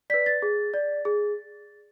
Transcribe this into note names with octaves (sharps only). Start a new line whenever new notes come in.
B4 D5 B6
A6
G#4
D5
G#4